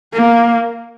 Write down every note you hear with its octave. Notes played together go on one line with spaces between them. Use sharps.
A#3